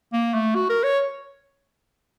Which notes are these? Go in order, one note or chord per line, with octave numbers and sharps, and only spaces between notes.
A#3
A3
F#4
A#4
C#5